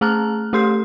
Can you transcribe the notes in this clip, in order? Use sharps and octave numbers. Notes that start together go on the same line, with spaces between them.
A3 G#4 A5 A#5 F6 F#6
A3 G4 A4 C6 G6 C7